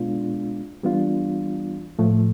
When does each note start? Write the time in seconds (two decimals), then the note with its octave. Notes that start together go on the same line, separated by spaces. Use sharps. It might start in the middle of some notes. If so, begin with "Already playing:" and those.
Already playing: B2 G#3 B3 D4 F4
0.83 E3 G3 B3 D4 F4
1.99 A2 F3 A3